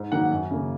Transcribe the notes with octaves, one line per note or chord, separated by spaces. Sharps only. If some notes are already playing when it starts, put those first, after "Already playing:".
Already playing: G#2
D#3 F#3 A#3 F#5
F#2
C#3 A#3